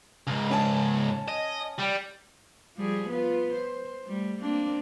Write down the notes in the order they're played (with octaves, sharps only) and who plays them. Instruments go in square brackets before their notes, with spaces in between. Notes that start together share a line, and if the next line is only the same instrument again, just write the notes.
[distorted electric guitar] C#2 G#2
[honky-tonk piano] C#4 G#5 A5
[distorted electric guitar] D#5
G3
[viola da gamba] F3 G3 G#4
B3 F4
C5
G3 A3
A#3 C4 D4